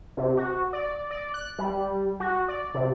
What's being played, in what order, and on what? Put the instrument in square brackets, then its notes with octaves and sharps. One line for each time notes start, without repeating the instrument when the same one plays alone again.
[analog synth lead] C3
F#4
D5
D5
F#6
G3
F#4
D5
C3